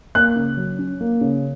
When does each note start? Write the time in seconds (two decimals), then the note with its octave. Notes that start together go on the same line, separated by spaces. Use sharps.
0.15 A#3 F#6
0.36 C#3
0.57 F#3
0.79 C#4
1.01 A#3
1.21 C#3